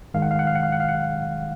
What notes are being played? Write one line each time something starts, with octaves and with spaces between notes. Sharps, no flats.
G#2 D#3 G#3 F5
F#5
F5
F#5
F5
F#5
F5
F#5
F5
F#5